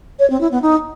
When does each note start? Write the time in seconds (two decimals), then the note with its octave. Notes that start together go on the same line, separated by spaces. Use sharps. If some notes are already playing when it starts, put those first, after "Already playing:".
0.19 C#5
0.30 C4
0.41 E4
0.51 B3
0.62 D#4